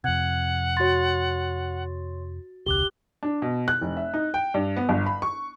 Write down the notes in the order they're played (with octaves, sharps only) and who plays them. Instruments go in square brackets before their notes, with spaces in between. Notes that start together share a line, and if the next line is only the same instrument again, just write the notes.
[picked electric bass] F2 C3 [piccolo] F#5 [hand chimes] F#6 G#6
[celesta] F#4 A6 [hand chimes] C#5 C6
[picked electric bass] E1 C#2 [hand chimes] G4 D6 F#6 [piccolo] G7
[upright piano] D4
B2
F#6
F1
E5
D#4
G5
G2
B3
G1
B5
C#6